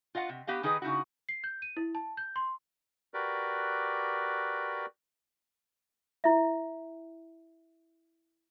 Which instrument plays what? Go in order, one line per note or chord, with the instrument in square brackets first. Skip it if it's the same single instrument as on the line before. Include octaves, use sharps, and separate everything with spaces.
[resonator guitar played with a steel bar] F4 D#5 F5 F#5
C3
B3 G4 D#5 F5
D#3 D#4 G#4 B4 D#5
C#3 D#4 E4 F#4
[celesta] C7
G6
D#7
E4
A5
G6
C6
[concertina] F#4 G4 A#4 B4 D5
[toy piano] E4 E5